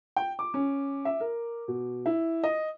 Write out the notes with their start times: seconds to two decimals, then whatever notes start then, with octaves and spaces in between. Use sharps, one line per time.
0.16 G5
0.39 D6
0.54 C#4
1.05 E5
1.20 A#4
1.68 B2
2.06 E4
2.44 D#5